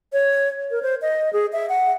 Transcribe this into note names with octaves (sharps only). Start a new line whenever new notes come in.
C#5
A#4
C5
D#5
G#4
E5
F#5